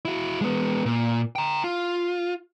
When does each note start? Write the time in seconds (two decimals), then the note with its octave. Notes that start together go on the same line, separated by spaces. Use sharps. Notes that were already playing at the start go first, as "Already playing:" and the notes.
0.05 E4 F#4
0.41 G#3 B3
0.86 A#2
1.35 G5 A#5
1.64 F4